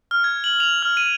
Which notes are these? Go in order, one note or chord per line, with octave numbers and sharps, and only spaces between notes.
F6
G#6
F#7
F7
F6
D#7